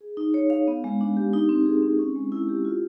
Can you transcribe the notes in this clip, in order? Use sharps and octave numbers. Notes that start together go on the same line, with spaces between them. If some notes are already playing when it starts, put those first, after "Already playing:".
G#4
D#4
C#5
F5
B3
G#3
D4
G4
D#4
C4
G#4
C4
C#4
G#3
E4
G4
F4